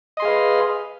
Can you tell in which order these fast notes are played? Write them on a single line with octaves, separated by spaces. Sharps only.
D#5 C6 G#4 F5 B4